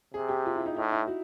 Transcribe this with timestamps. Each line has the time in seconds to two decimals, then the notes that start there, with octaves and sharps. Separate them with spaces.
0.14 C3 G#4
0.29 G4
0.46 F4
0.56 E4
0.66 D#4
0.76 A2 D#4
0.92 E4
1.07 F#4